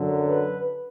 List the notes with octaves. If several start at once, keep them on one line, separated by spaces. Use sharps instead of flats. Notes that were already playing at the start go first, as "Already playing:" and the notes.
Already playing: F#2 D3 F#3
B4